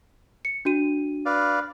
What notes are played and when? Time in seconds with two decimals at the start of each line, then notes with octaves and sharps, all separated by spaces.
0.45 C#7
0.65 D4 F#4 D#7
1.26 B4 D5 F5